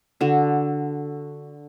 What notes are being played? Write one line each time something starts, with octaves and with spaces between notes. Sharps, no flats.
D3 F#4